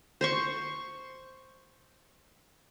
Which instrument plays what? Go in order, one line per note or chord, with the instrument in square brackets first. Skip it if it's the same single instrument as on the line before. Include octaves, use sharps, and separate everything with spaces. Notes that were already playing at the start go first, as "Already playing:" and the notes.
[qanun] C5 C6 C#6